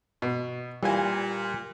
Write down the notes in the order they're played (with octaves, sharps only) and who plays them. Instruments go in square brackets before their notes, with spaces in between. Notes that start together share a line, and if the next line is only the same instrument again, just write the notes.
[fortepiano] B2
[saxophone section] A#2 [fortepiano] E3 F4 G#5 [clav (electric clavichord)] G3